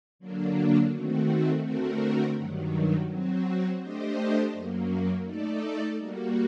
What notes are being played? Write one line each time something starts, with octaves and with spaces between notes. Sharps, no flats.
D3 F#3 A#3 D4
D#3 A3 C4 F#4
D3 A3 C4 F#4 A#4
G2 D#3 F#3
F#3 C4 F#4
A3 D4 G4 C5 D#5
F#2 F#3 A#3
A3 D#4 A4 D5
G3 A#3 F#4